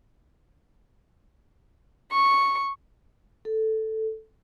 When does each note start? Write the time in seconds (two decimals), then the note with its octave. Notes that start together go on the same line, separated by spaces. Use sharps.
2.12 C#6
3.45 A4